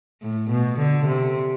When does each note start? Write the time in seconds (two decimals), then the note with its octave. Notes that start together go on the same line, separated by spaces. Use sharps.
0.22 A2
0.50 B2
0.79 D3
1.07 C3